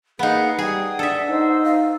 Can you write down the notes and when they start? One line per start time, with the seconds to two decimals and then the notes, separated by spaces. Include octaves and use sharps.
0.19 A#3 B3 D#4 G#4 F5 F#5
0.59 G3 G#4 F#5 G5 D#6
0.99 D4 A4 E5
1.29 D#4 C5 D#5 E6
1.63 F5